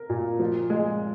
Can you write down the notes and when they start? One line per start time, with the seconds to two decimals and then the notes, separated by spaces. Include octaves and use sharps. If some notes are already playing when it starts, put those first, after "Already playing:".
Already playing: A#4
0.10 A#2
0.39 F3
0.70 G#3